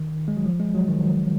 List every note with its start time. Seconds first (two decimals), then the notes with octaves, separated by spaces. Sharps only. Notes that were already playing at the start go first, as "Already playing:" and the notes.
Already playing: D#3
0.28 G#3
0.37 F#3
0.46 F3
0.60 G#3
0.75 F#3
0.88 D#3
1.03 F#3